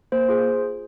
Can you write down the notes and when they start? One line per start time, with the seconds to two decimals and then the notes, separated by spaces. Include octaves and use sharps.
0.12 A#3 C5
0.29 F4 G#4